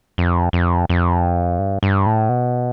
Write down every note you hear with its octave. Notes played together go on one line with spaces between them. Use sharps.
F2
F2
F2
G2
G2
A2
B2